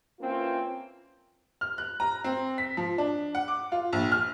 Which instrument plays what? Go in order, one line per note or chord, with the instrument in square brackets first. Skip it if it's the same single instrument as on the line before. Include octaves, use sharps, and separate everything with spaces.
[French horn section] E3 A#3 C4 C#4 F4
[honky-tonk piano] F6
F#6
A#5
C4
B6
F3
D4
F#5
D6
F4
A#1
F6